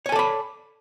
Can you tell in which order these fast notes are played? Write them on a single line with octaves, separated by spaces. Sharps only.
C#5 G#5 A4 D5 B5